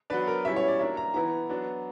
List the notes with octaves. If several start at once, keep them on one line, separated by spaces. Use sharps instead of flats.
F#3 B3 D4 B4
A#4
B2 G3 C#4 E4 E5
C#5
D5
F#3 A#3 D4 E5
A#5
E3 B3 E4 A#5
F#3 B3 D4